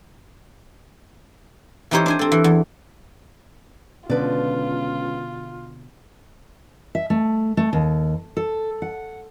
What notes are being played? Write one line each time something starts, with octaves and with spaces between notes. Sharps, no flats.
E3 C4 D#4 G4 C5 C#5
D4 C5 G#5
C4 A4
E3
E2
C#2 B2 D3 F4 B4 D5
E5
A3
A3
D#2
A4
F#5